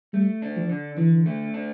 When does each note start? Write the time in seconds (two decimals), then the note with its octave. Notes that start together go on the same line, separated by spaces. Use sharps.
0.13 G3 A3
0.42 D4
0.56 F3
0.69 D3
0.98 D3 E3
1.26 A3
1.54 D4